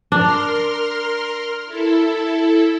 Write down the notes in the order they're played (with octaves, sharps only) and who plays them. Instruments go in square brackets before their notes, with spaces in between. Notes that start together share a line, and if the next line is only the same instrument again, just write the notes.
[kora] D4 [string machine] A#4 C6 F6
[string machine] E4 A4